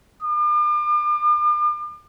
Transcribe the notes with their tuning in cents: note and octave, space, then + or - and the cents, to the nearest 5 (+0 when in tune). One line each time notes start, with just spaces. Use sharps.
D6 +40